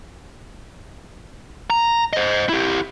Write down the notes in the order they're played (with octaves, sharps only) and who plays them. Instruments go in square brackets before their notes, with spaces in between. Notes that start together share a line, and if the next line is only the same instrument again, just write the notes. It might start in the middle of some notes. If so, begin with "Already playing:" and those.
[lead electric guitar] A#5
C5 D#5
E4 G4